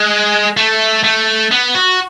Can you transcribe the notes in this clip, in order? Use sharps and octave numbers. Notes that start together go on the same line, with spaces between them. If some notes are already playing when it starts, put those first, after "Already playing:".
Already playing: G#3
A3
A3
B3
F#4